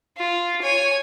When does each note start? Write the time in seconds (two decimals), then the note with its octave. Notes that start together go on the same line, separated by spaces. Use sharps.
0.17 F4
0.62 C#5 G#5